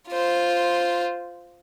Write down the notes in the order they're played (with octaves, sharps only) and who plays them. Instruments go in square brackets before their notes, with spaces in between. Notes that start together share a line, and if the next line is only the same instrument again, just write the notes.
[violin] F4 C5